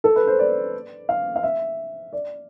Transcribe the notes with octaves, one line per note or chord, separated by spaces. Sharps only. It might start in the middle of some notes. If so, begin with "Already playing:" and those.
A4
B4
C5
D5
F5
F5
E5
D5